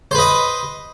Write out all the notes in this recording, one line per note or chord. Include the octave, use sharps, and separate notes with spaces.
B4 C5 D#5